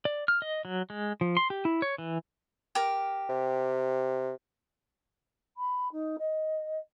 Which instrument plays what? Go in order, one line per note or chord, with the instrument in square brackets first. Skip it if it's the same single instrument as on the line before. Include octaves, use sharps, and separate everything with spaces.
[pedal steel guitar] D5
F6
D#5
F#3
G#3
F3
C6
G4
E4
C#5
E3
[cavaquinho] G4 A#4
[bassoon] C3
[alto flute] B5
D#4
D#5